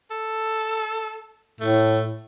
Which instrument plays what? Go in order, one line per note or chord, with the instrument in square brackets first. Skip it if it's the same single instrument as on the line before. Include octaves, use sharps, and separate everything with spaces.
[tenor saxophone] A4
[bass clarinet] A2 [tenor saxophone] A3